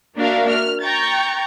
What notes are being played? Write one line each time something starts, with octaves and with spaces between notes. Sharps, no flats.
A#3 D4 F#4 A#4 E5 F5
F6
G5 A#5 C#6 G6 A6